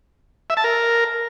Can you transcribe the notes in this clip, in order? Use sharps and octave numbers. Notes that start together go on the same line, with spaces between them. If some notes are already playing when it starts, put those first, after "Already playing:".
E5
A5
A#4